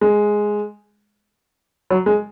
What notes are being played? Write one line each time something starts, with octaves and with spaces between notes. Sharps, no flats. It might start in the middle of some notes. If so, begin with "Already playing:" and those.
G#3
F#3
G#3